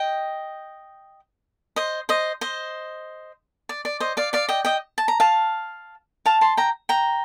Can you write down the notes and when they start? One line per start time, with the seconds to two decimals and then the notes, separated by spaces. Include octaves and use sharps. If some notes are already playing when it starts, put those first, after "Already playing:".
Already playing: D#5 G5
1.76 C5 D#5
2.09 C5 D#5
2.41 C5 D#5
3.69 D5
3.85 D5
4.00 C5 D#5
4.17 D5 F5
4.33 D5 F5
4.49 D#5 G5
4.65 D#5 G5
4.98 A5
5.08 A#5
5.20 F5 A5
6.26 F5 A5
6.41 A5 C6
6.57 G5 A#5
6.89 G5 A#5